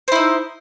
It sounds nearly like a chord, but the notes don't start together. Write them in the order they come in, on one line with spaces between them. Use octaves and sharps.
C5 E4 D#4